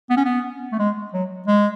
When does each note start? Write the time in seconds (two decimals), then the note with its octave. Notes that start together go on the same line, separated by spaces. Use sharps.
0.10 B3
0.17 C#4
0.25 B3
0.73 A3
0.79 G#3
1.14 F#3
1.48 G#3